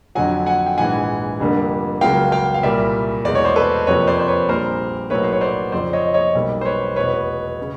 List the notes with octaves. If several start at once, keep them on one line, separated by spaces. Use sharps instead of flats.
F2 D3 F#3 F#5 G#5
F#5 G#5
G5
A#1 G#2 E3 F#5 G#5
F1 F2 D3 G3 A#3
C#2 C#3 F#3 A#3 F5 G5
F5 G5
F5
C2 A#2 G3 A#3 D5 E5
E2 B2 G#3 D5
C#5
C5 D5
A4 B4
F2 C3 F3 A#3 B4 C#5
C5 D5
C5
B4 C#5
A#1 A#2 G3 A#3 A#4 C5
B1 A2 F#3 A#3 B4 C#5
C5
C#5
C5 D5
F2 C#3 F3 C5 D5
C#5 D#5
C#5 D#5
B1 B2 G3 A#3
C5
B4 C#5
F1 E2 B2 B4 C#5
C#3